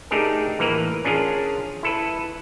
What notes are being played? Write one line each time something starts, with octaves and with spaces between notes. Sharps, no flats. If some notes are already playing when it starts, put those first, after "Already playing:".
A3 D4 D#4 G4 G#4 A#4
A2 E3 A#3 A#4 B4
C#4 D4 F4 G#4 A#4
E4 A4 B4